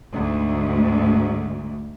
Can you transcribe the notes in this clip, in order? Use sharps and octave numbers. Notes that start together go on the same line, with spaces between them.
D2 G#2